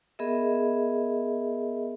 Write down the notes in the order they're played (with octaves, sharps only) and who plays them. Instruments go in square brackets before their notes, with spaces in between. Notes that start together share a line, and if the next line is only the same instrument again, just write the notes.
[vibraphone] B3 G#4 A#4 D#5 E5